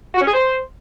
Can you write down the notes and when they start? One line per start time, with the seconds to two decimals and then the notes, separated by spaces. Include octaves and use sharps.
0.14 F#4
0.21 C#4
0.27 G#4
0.34 C5